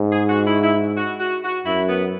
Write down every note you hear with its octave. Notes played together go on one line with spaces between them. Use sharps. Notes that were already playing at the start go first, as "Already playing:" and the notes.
Already playing: G#2
G#4
F#4
E4
E4
F#4
F#4
F#4
F#2 E4
B3